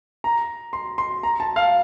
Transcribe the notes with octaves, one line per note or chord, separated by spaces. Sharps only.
A#5
C6
C6
A#5
A5
F5